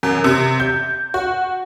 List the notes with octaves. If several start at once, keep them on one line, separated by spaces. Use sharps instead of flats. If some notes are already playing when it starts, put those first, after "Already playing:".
F#2
C3
G6
F#4